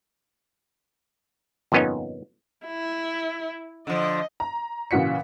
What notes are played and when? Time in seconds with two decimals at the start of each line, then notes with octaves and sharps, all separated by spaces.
1.72 G1 F2 A#2 B3 C#4 D#4
2.66 E4
3.87 D3 F3 D#5
4.40 A#5
4.91 A#2 C#3 E3 F#4 B6 C#7